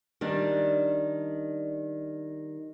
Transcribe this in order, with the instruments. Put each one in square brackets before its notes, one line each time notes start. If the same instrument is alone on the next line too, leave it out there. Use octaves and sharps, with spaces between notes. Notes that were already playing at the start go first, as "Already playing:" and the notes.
[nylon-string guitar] D#3 G3 D4